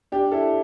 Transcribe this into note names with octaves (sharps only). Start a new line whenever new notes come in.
D4 G4
E4 A4